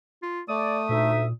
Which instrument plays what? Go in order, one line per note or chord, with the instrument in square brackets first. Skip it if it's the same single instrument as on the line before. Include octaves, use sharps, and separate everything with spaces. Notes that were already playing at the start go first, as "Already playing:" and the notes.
[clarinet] F4
[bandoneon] A3 [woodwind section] D5 [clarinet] D#6
[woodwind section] D2 D#4 E5 [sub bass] A#2